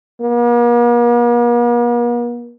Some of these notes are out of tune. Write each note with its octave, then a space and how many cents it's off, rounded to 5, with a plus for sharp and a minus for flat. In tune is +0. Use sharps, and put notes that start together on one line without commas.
A#3 +45